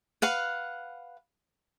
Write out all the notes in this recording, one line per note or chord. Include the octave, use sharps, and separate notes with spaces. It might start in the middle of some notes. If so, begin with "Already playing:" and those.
B4 F5 F#5